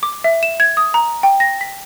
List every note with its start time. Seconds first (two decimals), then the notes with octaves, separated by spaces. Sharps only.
0.03 D6
0.24 E5
0.43 E7
0.60 G#6
0.77 D#6
0.94 A#5
1.23 G5
1.40 A#6
1.61 B6